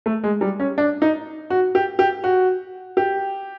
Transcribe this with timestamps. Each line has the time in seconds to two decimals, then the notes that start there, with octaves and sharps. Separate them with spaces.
0.06 A3
0.24 G#3
0.41 G3
0.60 C#4
0.78 D4
1.02 D#4
1.50 F#4
1.75 G4
1.99 G4
2.24 F#4
2.97 G4